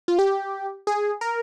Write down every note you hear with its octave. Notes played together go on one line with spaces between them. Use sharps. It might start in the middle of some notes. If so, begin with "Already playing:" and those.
F4
G4
G#4
A#4